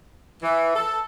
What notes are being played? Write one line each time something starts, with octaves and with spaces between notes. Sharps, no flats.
E3
A4